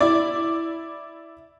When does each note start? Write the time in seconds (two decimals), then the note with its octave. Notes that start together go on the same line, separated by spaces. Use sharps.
0.01 E4 D5